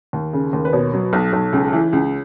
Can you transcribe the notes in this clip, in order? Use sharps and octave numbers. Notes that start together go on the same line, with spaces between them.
D#2
C#3
D#2
B4
B2 C#5
F#3
B1
B1
C#2
E3
C#2